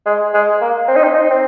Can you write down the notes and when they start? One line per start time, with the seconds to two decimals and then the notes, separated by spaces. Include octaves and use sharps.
0.06 G#3
0.34 G#3
0.61 A#3
0.88 C4
0.96 D#4
1.04 C4
1.14 D#4
1.31 C4